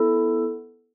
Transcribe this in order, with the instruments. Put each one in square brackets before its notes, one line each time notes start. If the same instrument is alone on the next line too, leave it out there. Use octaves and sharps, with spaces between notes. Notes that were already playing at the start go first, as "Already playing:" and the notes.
Already playing: [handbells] B3 E4 A4